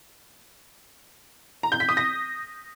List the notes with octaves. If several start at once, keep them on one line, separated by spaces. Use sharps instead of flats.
A#5
G6
B6
D#6
A#6